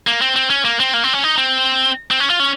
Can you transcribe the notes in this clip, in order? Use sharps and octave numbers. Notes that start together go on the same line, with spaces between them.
A#3
C4
C4
C#4
A#3
C4
A#3
C4
C#4
D#4
C4
C4
C#4
F4
C#4